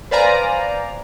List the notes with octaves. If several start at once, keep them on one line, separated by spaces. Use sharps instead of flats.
B4 C5 D5 F5 G#5 A#5